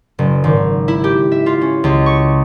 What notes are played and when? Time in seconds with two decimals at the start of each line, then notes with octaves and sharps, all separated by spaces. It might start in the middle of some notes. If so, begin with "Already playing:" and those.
0.19 F#1
0.44 G#1
0.88 E4
1.04 G4
1.32 E5
1.46 F4
1.61 C#4
1.84 C#2
2.06 C#6